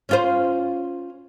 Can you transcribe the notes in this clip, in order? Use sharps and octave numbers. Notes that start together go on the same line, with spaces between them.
C#4 F4 C5